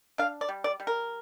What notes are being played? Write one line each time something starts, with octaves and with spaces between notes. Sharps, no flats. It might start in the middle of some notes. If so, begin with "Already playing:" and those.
D4 F5
D5
G3
D5
G3
A#4